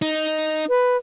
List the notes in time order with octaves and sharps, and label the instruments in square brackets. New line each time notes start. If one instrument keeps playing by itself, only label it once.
[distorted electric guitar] D#4
[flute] B4